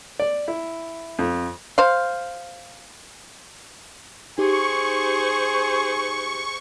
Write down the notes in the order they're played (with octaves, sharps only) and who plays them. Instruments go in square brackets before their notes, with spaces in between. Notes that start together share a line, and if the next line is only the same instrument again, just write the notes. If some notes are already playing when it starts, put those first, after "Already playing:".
[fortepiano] D5
E4
F2
[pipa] C5 F5
[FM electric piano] D#4 G4 D6 [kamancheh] G#4 C5 [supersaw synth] C#6